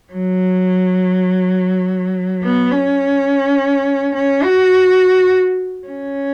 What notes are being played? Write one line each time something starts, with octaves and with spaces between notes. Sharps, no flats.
F#3
B3
C#4
C#4
F#4
C#4